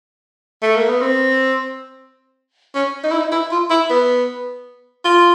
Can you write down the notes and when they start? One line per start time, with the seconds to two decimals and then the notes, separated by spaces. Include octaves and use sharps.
0.63 A3
0.76 A#3
0.89 B3
1.02 C4
2.75 C#4
3.04 D#4
3.11 E4
3.18 D#4
3.32 E4
3.52 F4
3.70 E4
3.90 B3
5.05 F4